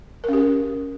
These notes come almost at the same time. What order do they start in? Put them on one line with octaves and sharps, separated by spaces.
A#4 C#4 G4